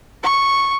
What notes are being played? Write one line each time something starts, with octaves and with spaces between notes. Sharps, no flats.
C#6